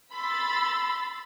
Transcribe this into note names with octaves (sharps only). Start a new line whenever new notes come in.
B5 C6 E6 A6